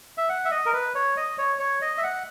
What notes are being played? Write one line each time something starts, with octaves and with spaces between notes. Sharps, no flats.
E5
F#5
E5
D#5
A#4
B4
C#5
D#5
C#5
C#5
D#5
E5
F#5